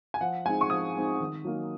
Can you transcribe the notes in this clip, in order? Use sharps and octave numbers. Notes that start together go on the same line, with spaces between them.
G#5
F3 F#5
G#3 C4 D#4 G#5
C#6
F3 D#6
G#3 C4 D#4
D#3
F#3 A#3 D#4